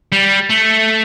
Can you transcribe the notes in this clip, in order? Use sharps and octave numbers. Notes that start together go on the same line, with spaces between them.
G3
A3